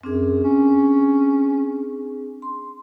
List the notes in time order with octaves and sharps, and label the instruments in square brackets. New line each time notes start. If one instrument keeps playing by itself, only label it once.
[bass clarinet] F#2 [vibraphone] C4 D4 G#4
[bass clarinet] C#4
[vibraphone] C6